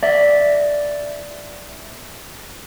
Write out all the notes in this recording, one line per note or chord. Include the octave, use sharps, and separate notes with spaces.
D5 E5